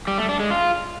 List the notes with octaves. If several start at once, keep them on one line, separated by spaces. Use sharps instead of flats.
G3
A3
D4
G#3
F4